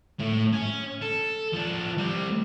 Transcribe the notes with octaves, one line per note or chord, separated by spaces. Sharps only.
A2
C#4
A4
F3 D4
G3 C4